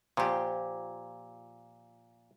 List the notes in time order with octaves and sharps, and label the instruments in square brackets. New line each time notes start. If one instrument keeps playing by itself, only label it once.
[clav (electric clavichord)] A#2 [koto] F3 G4